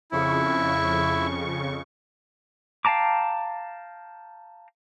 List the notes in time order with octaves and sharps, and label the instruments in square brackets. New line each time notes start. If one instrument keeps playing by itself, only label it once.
[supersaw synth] F2 C#3 C#6 [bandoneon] E4
[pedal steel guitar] F5 G5 A5 A#5 D6